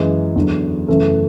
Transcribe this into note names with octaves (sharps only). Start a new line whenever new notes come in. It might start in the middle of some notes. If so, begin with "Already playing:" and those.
Already playing: F#2 E3 G#3
E2 D3 F#3
F#2 C#3 E3 A3 E5